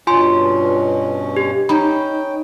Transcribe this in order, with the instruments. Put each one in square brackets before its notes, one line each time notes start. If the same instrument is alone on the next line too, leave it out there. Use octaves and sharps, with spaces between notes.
[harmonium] G2 B2 C#4 [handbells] F4 G#5 C6
[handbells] G4
[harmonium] C#4 G5 [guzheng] D#4 [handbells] B5